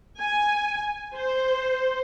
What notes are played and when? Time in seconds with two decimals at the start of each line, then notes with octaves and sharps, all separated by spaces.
0.19 G#5
1.17 C5